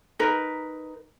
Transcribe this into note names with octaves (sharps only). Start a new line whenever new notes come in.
D#4 A#4 B4